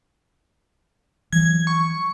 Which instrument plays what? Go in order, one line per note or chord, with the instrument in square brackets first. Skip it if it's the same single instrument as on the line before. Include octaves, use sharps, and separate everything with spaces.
[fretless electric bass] E3 F#3 [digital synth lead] G#6
[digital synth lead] C#6